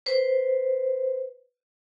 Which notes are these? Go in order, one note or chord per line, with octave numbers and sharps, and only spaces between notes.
B4 C5